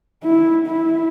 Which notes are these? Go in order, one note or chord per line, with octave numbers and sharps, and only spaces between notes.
E4
E4